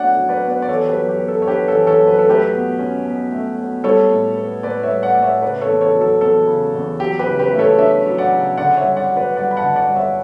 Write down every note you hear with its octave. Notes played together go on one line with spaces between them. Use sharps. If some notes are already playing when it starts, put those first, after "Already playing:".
Already playing: B2 F#3 A3 D4 C#5 D5 F#5
F#3
B4 D5
B2
B4 D5
D5
E3 A4 C#5
G4 B4
F#2
G4
B3
A4
C#5
D4 G4 B4
A4 C#5
E3
A4 C#5
F#2
B4
A4
A3 G4 B4
B2
C#4
B2
A3
B2
G3 A4 C#5
A2
B3
A2 B4 D5
C#5 E5
G3
D5 F#5
A2 D5
C#5 E5
C#3 B4 D5
A4 C#5
E2
A4 C#5
F#3
A4
E2 A4
C#3
E2
F#3 G4
G4 B4
C#3
G4 B4
A3
A4 C#5
D4 C#5 E5
F#3
D5 F#5
C#3
D3 D5 F#5
C#5 E5
G2
D5 F#5
F#3
B4 D5
G2 D5 F#5
B5
F#5 A5
D3
D5 F#5
G2
C#5 E5